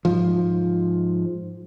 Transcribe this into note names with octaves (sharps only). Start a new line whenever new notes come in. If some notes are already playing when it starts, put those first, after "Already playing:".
G#2 F3